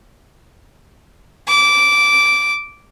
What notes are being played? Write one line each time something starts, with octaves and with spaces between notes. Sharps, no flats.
D6